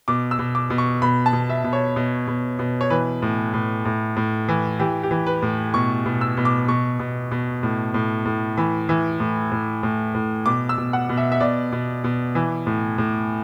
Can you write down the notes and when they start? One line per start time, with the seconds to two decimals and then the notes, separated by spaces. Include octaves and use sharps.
0.08 B2 D6
0.31 E6
0.39 B2
0.55 D6
0.70 B2
0.78 C#6
1.02 B2 B5
1.26 A5
1.33 B2
1.49 E5
1.64 B2
1.73 C#5
1.96 B2
2.27 B2
2.59 B2
2.81 C#5
2.90 E3 B4
3.22 A2
3.54 A2
3.85 A2
4.17 A2
4.48 E3
4.79 E3 G4
5.03 G4
5.11 E3
5.26 B4
5.42 A2
5.74 B2 C#6
6.06 B2
6.21 E6
6.37 B2
6.45 D6
6.68 B2 C#6
6.99 B2
7.31 B2
7.63 A2
7.94 A2
8.26 A2
8.57 E3 B5
8.89 E3
9.20 A2
9.52 A2
9.83 A2
10.15 A2
10.46 B2 D6
10.69 E6
10.78 B2
10.93 F#5
11.09 B2
11.17 E5
11.32 E5
11.40 B2 D5
11.72 B2
12.04 B2
12.35 E3
12.67 A2
12.98 A2